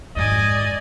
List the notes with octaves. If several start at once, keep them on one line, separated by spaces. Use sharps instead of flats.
G#1 F2 D5 D#5 G#5